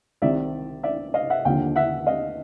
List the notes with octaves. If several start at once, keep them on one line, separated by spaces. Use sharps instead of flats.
C2 C3 D#3 D5 E5
D5 E5
D#5 F5
E5 F#5
D#2 D3 F3 F5 G5
E5 F#5
D#5 F5